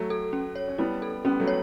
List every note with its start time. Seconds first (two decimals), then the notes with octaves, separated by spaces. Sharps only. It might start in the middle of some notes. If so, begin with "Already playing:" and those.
Already playing: F#3 A3
0.10 A4
0.33 C#4
0.55 C#5
0.68 C#4
0.78 G3 B3 E4
1.02 A4
1.25 G3 B3 C#4
1.40 F#3 A3
1.47 C#5